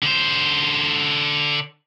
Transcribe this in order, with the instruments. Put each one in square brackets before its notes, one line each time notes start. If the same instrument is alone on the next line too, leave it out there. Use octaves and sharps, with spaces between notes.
[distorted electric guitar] D3 C5